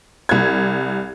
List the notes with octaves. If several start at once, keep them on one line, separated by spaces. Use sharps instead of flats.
C2 G#6